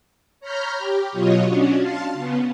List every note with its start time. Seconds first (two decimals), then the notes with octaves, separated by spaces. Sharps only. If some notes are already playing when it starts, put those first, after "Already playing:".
0.40 C#5 A#5 B5 F6 G6
0.78 G4
1.12 B2 F#3 F4 C#5 D#5
1.49 C#4 D4 F#4
1.81 F5 A5 C6
2.13 C#3 B3